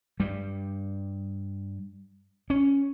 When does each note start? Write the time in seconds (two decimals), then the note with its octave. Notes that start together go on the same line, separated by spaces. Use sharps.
0.20 G2 G3
2.50 C#4